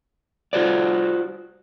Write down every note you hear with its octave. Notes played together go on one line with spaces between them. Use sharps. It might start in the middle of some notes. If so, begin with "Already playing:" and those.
F4 F#4 C5 D5